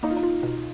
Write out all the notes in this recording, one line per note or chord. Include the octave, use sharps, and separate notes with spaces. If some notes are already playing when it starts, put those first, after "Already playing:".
A#3 D#4
F4
D#4
F4
B2